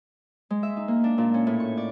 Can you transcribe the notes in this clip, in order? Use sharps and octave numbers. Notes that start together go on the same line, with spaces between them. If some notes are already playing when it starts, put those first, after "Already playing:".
G#3
E5
D#4
A#3
D4
A#2
C#4
A2
C#6
D5